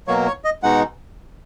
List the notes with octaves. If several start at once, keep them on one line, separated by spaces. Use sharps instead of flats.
B2 F#3 A#3 C#5
C#5
D#5
B2 G#3 D#4 F#5